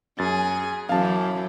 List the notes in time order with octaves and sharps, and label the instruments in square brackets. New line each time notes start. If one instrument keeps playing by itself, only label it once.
[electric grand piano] F#2 A6 [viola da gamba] G#4
[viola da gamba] F#2 E3 [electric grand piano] F5 A5